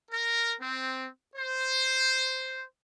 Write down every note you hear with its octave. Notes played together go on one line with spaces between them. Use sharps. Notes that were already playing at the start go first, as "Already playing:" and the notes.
A#4
C4
C5